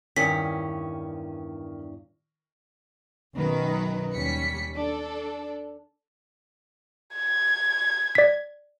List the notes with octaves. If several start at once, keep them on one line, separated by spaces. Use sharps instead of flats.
E2 G2 D#3 C#4 A#4 B6
B1 F#2 D#3 A#4 B4
D#2 G3 C#4 B6 C#7
D4 A4
G#6
D5 B6